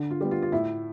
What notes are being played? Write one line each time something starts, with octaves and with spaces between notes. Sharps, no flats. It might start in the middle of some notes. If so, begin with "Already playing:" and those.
Already playing: D3
F4
G3 B3
F4
F4
A2 E4